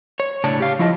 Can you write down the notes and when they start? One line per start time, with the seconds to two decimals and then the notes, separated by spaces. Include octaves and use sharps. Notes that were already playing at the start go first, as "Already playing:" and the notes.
0.20 C#5
0.44 A2 C#3 D4 C#5 A5
0.60 G4 F5
0.79 F3 E4 F4 D#5 A5